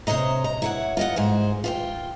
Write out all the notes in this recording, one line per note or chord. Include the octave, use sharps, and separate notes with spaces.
C3 C5 C#5 D#5 A#5
A#5
E4 C#5 F#5
F4 D#5 F#5
G#2 G#4 C5
F4 C5 G5